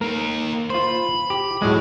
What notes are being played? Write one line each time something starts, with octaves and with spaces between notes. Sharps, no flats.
A#3 D#4 A#4
F4 C5 B5
G4
A2 F#3 G#3 C4